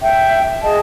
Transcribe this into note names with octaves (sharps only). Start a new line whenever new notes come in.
E5 G5
G#4 D#5 A5